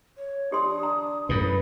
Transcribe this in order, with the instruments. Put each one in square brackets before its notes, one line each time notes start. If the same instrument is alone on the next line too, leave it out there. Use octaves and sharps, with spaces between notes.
[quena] C#5
[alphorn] D4 [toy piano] G4 C6 [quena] D#6
[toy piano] A#5
[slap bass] F#2 A2 [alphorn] B4